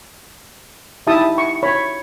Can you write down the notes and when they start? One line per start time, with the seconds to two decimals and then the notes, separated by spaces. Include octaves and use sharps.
1.07 D#4 E4 G4 E5 A5 D#6
1.38 C#6
1.63 C#5 B5